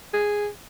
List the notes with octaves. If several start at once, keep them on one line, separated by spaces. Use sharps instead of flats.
G#4